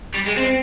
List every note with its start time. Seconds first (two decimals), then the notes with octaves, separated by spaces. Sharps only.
0.14 G3
0.26 G#3
0.37 C4